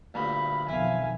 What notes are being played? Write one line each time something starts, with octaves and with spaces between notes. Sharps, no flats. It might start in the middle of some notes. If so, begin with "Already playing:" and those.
D2 G2 A#2 B5
B1 F2 D#3 E4 F5 G#5